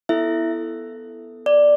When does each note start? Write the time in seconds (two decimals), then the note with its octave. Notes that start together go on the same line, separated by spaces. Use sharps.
0.09 B3 E4 A4 E5
1.46 D5